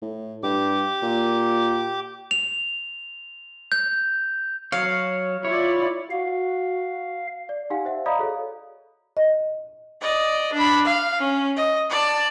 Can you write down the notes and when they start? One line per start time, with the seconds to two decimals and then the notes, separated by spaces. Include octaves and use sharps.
0.02 A2
0.43 G2 G4 D6
1.03 A#2
2.31 F7
3.72 G6
4.72 F#3 C#5 F5
5.45 E4 F4 C#5 D5
6.10 F#4 F5
7.49 D5
7.70 D#4 G4 F5 F#5 G#5
7.85 C5 E5 F#5
8.06 D5 D#5 F5 A#5 B5 D#6
8.19 F#4 G#4 A4 C#5 F5
9.17 D#5
10.01 D5 D#5
10.53 D4 B5
10.85 F5
11.19 C#4
11.57 D#5
11.90 D5 A5